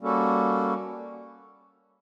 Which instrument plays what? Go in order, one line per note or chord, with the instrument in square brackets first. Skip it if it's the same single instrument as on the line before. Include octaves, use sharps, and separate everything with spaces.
[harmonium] G3 A#3 C#4 F#4 A4